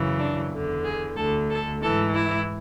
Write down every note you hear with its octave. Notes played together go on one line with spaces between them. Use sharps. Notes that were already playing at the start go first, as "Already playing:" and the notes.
Already playing: F#2 C#3 E3
D4
E2 D3
G#4
D2 D3 A4
A4
G#2 E3 A4
E4